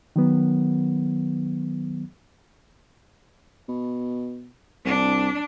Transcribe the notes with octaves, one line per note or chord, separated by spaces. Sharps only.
D#3 F#3 B3
B2
C2 D4